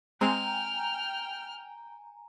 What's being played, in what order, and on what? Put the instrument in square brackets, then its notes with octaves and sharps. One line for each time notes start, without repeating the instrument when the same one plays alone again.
[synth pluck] G#3 C4 [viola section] G5 [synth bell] G#5 A#5 [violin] F6